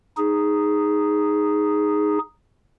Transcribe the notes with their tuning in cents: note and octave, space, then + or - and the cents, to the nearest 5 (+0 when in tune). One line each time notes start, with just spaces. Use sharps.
D#4 +0 G#4 +0